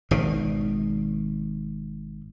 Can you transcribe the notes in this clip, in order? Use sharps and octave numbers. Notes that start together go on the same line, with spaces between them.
G#1 B2 D#3